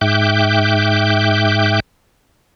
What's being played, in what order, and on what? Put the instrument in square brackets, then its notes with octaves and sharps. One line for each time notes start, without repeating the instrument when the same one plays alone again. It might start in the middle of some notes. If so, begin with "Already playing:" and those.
[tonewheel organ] G#2 E5 G5 D6 F#6 G6